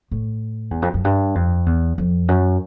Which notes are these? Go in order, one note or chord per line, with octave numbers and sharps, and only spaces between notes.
A2
E2
F2
F#2
G2
F2
E2
F2
F#2